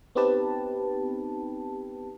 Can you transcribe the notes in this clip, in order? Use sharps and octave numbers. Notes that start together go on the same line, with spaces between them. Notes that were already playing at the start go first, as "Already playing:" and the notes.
B3 C4 D#4 G4 B4 A5